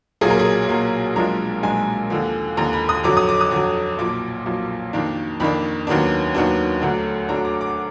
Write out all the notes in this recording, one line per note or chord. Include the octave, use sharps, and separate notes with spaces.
B1 A#2 F#3 A#3 G#4
A#4
G#4
B1 A#2 F#3 A#3
B1 A#2 F3 G#3 D4 A#4
B1 A#2 F3 G#3 D4 G#5
D#2 D3 F3
D#2 D3 F3 A#5
B5
D#6
F2 D3 F#3 D6
D#6
D6
D#6
F2 D3 F#3 D6
B1 A#2 F3 D6
B1 A#2 F3
F2 D#3 A#3 D4
F2 D#3 A#3 D4 B5
D#2 D#3 F#3 B3 D4
D#2 D#3 F#3 B3 D4
D2 D3 F#3 D4
D2 D3 F#3 D4 A#5
D6
D6